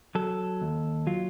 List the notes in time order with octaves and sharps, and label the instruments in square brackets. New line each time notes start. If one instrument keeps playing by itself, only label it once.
[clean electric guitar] F#3 A4
D#2
F#3 F4